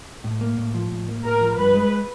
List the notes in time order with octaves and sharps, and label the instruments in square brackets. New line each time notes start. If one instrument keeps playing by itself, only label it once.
[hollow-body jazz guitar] A2
A#3
A2
F3
A2
A#3
[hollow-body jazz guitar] A2 [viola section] A#4
[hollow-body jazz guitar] F3
[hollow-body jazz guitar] G2 [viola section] B4
[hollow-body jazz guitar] G#3